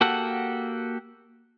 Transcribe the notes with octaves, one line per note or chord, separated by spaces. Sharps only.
A#3 F#4 G4 A4 F#5